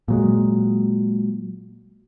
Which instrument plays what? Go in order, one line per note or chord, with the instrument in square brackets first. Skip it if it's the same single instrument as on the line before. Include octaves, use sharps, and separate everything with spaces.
[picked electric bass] A#2 F#3 G#3